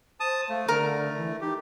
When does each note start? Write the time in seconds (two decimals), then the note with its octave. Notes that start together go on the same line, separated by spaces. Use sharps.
0.20 C5 A5 D#6
0.49 A3 F5
0.68 D3 A#4
1.17 E3
1.41 D#4 G4